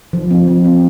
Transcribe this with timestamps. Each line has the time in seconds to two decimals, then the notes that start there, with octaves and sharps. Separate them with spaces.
0.13 F3
0.31 C4 F4
0.48 F3
0.64 C4 F4